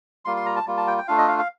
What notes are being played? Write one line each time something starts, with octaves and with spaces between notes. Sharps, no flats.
G3 A#3 F4 C6
C6
A#5
A5
G3 A#3 F4
A5
G5
G5
A3 D4 F4 F5
D#5
F5
F5